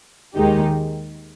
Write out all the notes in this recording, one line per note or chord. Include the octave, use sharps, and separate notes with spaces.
D#2 D#3 G#3 D#4 G4